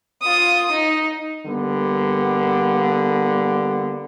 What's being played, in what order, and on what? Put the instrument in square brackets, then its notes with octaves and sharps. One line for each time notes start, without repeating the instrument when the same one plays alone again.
[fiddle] F4 D#6
D#4
[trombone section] D3 G3 A#3 B3